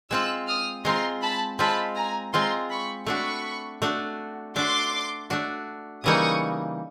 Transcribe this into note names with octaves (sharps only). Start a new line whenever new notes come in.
G#3 C4 F4 E6 F#6
D#6 F6
G#3 C4 F4 A#5 C6
A5 B5
G#3 C4 F4 A5 B5
G#5 A#5
G#3 C4 F4 A#5 C6
B5 C#6
A3 D4 F#4 B5 C#6
A3 D4 F#4
A3 D4 F#4 C6 D6
A3 D4 F#4
C#3 E3 G3 A#3 D#4 C#6 D#6